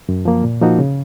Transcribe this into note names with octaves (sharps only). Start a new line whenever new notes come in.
F#2
F3 A#3
A#2
F3 A#3 D#4 F#4
C#3